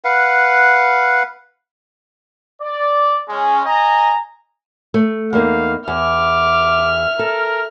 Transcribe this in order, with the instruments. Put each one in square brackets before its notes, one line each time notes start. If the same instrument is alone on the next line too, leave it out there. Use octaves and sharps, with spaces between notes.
[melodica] B4 F5 F#5
[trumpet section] D5
G#3 C#4
D#5 G#5 A#5
[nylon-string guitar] A3
[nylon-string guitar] E2 A#3 D#4 [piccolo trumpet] F5
[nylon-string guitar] E2 [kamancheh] E5 F6 [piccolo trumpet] D6
[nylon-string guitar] A4 [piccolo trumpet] A#4